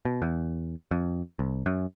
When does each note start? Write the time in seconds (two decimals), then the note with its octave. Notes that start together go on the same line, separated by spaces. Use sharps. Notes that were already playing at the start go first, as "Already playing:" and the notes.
0.05 B2
0.22 E2
0.91 F2
1.39 C2
1.66 F#2